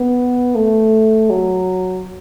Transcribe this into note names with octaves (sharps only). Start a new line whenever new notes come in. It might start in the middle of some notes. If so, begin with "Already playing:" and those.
Already playing: B3
A3
F#3